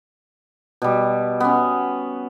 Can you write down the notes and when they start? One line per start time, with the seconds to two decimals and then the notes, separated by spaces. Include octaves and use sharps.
0.82 B2 G3
1.40 B3 C#4